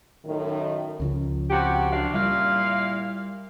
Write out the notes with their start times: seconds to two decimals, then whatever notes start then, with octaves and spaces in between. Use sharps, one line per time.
0.25 F#2 A2 D#3
1.00 C#2 C#3 F3
1.50 C3 F#4 G4
1.91 F#2 D4 F5
2.14 A#2 G3 E4 F5